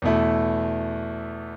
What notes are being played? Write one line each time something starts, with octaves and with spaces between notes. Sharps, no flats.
E2 B2 A3 E4